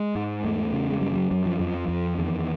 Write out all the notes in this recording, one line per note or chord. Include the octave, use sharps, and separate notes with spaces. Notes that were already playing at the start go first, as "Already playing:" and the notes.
Already playing: G#3
G#2
E2 A3
C#3
G#3
F#2 G3
F3
F#3
F#2 F#3
F3
F2 F3
F2
E2 D#3